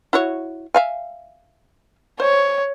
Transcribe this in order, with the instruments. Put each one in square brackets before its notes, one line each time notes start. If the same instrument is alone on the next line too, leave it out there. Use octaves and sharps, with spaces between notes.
[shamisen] E4 F#4 C#5
E5 F5 G#5
[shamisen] C5 [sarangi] C#5